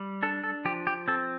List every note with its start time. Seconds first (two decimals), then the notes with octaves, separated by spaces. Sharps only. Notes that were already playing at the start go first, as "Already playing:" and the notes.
Already playing: G3
0.23 D4 A4
0.44 A4
0.65 F3 G4
0.87 G4
1.08 C4 A4